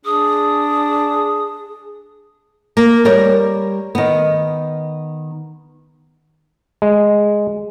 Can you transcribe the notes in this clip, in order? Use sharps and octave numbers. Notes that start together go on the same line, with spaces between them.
D4 G#4 D#6
A#3
G3 A#4 C#5
D#3 B3
G#3